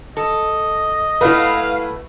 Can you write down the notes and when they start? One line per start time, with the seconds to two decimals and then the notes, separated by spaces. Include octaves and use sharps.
0.17 A4 D#5
1.21 A3 E4 F#4 B4 F5